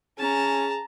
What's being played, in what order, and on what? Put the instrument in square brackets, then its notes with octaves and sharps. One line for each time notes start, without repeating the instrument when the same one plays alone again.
[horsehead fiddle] C#4 [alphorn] G#4 [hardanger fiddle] A5 A#5